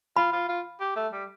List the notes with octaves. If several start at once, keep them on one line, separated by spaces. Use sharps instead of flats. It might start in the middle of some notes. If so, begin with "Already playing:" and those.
F4 B5
F4
F4
G4
A3
G3